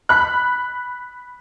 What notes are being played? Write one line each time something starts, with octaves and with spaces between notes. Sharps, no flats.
B5 F#6